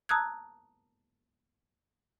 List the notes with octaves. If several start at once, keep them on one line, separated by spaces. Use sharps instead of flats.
A5 A#5 D#6 E6 F#6 G#6